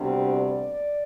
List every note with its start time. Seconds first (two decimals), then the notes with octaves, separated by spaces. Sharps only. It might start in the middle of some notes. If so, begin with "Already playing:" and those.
Already playing: D2 C3 G3 B3 D4
0.28 D5